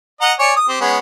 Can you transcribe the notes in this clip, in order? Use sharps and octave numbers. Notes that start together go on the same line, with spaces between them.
D#5 F#5 A#5
C#5 D5 G#5
D#6
C4 G4
G#3 B3 C#4